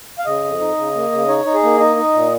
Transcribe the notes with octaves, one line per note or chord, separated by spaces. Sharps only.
F5
C#3 D#5
F2
D#4
C#3
A#3
C#3
D#4 C#5
D#4
G#4
A#3
D#4 D#5
D#4
A#2